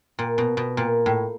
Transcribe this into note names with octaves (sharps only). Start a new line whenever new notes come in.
A#2
B2
B2
A#2
A2